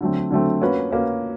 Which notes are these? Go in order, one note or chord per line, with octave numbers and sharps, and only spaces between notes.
D3 F#3 A3 C4
D3 F#3 A3 C4
A#3 C#4 F#4 B4
A#3 C#4 F#4 B4